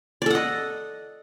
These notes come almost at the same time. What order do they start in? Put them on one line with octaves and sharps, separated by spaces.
D5 A4 F#5 D#5